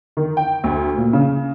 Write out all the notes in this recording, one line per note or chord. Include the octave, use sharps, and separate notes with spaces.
D#3
G5
D2
A#2
C#3